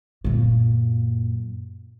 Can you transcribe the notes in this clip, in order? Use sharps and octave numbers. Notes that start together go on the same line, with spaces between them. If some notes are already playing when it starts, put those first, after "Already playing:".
F#2 A#2